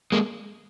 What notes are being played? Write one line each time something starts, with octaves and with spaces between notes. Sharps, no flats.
G#3 A#3